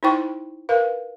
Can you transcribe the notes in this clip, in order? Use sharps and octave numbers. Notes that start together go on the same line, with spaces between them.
D#4 E4 C5 G5 C#6
A#4 B4 F5